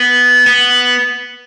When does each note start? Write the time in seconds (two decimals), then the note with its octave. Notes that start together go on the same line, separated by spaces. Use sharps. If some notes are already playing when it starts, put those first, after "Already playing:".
Already playing: B3
0.47 B3